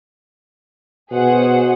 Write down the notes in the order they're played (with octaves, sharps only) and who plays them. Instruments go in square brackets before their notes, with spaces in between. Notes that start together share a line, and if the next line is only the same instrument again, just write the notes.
[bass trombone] B2 [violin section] G#4 C5 F#5